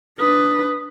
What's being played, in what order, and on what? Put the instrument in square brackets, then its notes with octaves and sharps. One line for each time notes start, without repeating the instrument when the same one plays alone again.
[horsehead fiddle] D4 B4 [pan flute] D#6